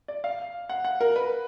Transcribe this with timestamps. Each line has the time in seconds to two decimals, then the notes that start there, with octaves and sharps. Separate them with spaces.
0.08 D5
0.24 F5
0.69 F#5
0.85 F#5
1.01 A#4
1.16 B4